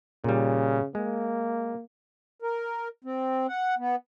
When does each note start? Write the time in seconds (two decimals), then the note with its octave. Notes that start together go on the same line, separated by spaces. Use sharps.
0.24 A#2 C#3 G3
0.95 G#3 A#3
2.42 A#4
3.04 C4
3.48 F#5
3.78 B3